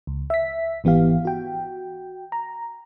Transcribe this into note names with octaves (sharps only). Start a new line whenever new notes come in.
C#2
E5 B6
G#1 E3 B3 G4 F5
F#4 G5
A#5